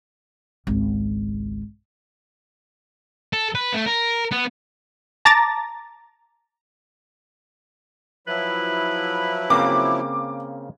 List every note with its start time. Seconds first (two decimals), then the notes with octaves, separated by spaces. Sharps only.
0.67 G#1 C#2
3.33 A4
3.55 B4
3.74 A3
3.86 A#4
4.31 B3
5.25 A5 A#5 D6 A6 A#6
8.27 F3 F#3 E4 B4
9.50 C#3 A#3 C4 D6